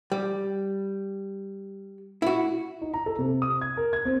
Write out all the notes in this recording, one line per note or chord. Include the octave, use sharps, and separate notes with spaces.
G3
E4 F#4
D#4
A#5
A4
C3
D#6
G#6
A#4
G#6
C4